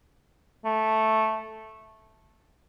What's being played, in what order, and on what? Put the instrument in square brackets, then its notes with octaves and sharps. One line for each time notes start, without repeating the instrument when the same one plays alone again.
[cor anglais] A3